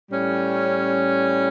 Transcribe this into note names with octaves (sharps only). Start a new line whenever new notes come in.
A2 G3 C#4